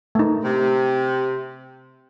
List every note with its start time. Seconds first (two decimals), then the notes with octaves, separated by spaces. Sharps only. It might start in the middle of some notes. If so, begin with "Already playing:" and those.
0.15 A3 D#4
0.44 C3